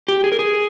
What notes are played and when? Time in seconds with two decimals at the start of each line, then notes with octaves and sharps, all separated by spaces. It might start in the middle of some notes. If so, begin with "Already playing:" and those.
0.08 G4
0.24 G#4
0.32 A#4
0.39 G#4